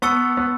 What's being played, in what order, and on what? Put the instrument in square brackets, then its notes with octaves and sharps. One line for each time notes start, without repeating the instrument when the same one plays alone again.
[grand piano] B3 [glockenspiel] A5 C#6 E6 A6 C#7
[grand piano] B3